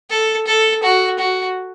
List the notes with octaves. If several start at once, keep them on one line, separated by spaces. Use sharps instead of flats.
A4
A4
F#4
F#4